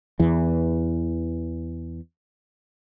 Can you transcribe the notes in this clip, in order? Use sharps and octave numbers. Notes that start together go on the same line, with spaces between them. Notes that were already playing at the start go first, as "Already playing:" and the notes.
E2 E3